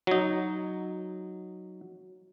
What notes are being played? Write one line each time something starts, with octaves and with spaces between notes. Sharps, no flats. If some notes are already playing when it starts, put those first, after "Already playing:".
F#3 D#4